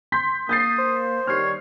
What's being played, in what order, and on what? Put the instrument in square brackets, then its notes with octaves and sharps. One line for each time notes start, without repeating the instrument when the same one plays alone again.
[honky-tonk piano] C6 G6 B6
[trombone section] A#3 [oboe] D#6 [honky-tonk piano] G6 A6 C7
[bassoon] C5
[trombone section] D#3 G3 [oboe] C#5 [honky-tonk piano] F6 C7